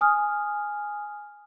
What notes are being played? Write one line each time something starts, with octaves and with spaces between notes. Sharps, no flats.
G#5 D#6 F6